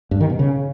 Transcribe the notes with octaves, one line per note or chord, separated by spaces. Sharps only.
G2
D#3
B2
C#3